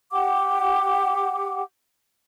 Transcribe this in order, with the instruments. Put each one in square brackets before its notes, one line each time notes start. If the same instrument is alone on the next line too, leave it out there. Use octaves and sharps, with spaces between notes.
[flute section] G4 F#5 G5 D6